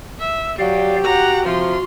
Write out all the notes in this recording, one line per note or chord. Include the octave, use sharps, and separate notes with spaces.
E5
F#3 G4 D5 F5
F#4 F#5 A#5
C3 F3 F4 C6